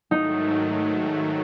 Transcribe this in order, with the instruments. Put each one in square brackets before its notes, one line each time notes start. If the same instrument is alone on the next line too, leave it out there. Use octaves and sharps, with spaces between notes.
[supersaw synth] G#2 D#3 F#3 A3 [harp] D#4